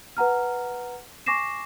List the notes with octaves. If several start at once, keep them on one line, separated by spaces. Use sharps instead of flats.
B4 F#5 A#5 F6
G#5 C#6 D6 A#6 C7 E7